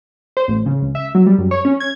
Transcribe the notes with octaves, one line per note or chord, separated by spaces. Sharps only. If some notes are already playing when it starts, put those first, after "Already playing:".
C5
A1
C#3
C#2
E5
F#3
G3
F#2
C#5
C#4
G#6